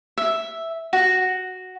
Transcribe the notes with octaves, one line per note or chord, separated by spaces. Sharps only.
E5
F#4